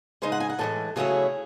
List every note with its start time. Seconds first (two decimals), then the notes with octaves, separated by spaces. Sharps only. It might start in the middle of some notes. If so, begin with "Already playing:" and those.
0.22 C#3 G#3 D#4 C5
0.32 F#5
0.40 G#5
0.50 F#5
0.59 A2 E3 G#3 A4
0.96 C#3 F#3 A3 C#4 E4 G#4